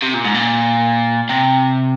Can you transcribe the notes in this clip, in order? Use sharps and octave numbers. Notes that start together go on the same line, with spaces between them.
C3
A#2
G#2
A#2
C3